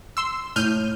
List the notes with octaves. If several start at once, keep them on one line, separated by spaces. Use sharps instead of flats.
C6 E6
A2 F6 G6 D#7